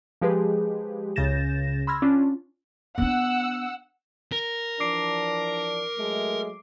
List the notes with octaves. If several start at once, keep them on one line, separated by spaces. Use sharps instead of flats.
F3 G#3 G4 G#4 B4
C#2 C#3 G6 A6 A#6 E7
B5 C6 E6 F6 G#6 A#6
C#4 D4 F4
B3 D4 F#5 E6
A#4
E3 F3 D4 D6 C7 D7
F#3 G#3 A3